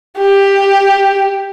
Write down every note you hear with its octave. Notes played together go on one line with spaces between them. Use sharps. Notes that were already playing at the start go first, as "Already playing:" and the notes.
G4